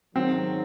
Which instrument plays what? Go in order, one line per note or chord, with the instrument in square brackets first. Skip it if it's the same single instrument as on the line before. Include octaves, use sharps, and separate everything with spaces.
[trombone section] G#2 D#3 F#3 [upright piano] C4